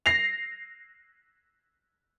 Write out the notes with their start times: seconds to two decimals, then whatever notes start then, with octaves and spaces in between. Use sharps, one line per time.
0.06 A#6 C7 F7